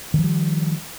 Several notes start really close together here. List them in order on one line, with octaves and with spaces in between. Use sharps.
D#3 F3 G3